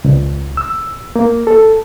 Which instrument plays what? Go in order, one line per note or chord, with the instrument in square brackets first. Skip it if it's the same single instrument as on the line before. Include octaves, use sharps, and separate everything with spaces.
[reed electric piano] C#2
E6
A#3
A4